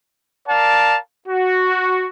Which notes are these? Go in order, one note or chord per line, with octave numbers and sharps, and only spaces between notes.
A#4 D5 F5 A5
F#4